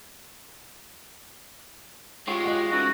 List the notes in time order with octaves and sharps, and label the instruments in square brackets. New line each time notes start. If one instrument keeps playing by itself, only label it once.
[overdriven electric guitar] G#3 [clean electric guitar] F4 G4 C#5
[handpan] D#5 F#5
[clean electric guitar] G#2 C#3 E3 [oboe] F#4